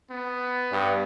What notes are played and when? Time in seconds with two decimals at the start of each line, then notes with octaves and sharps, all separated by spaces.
0.11 B3
0.72 G2